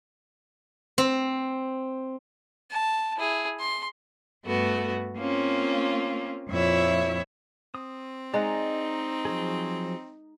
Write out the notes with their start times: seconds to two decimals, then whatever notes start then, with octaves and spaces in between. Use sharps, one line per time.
0.98 C4
2.71 A5
3.17 E4 G#4
3.60 C6
4.46 G2 A3 B3 F#4
5.18 A#3 C4 C#4 F4
6.49 F2 A#2 E4 C#5 E5
7.75 C4 D#6
8.34 G#3 D#4 D5 F#5 A#5
9.25 F3 F#3 G#4